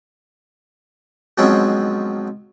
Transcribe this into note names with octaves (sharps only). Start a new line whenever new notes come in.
G#2 B2 F3 F#3 C4 C#4